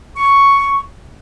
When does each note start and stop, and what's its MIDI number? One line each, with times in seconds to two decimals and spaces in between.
0.17 0.80 85